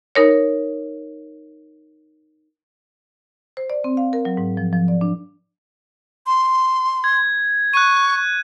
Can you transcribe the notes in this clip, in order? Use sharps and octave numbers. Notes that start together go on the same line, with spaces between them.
D#4 A#4 C#5
C5
D5
C4
F5
A#4
F#3
G#2
F3
F3
D5
D4
C6
G#6
C#6 F#6 D#7